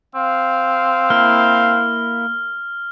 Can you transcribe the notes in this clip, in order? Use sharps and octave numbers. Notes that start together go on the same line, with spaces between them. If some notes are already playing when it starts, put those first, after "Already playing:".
C4 F5
A#3 E4 F6